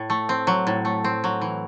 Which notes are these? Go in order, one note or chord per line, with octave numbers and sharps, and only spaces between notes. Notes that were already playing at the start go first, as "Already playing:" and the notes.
Already playing: A2
A3
C4
F#3
A2
A3
C4
F#3
E3